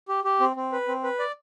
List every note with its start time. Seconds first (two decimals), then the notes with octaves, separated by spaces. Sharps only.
0.08 G4
0.24 G4
0.40 C4
0.56 C4
0.72 B4
0.88 C4
1.03 B4
1.19 D5